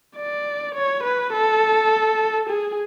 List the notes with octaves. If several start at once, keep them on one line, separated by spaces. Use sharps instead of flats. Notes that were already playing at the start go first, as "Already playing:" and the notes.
D5
C#5
B4
A4
G#4